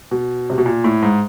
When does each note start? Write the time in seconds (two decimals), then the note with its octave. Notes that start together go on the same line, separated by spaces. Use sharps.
0.11 B2
0.50 C3
0.58 B2
0.66 A#2
0.84 A2
1.02 G#2